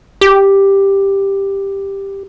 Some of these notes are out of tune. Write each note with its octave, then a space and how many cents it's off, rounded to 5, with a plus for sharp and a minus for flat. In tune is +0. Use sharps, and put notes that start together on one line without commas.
G4 +5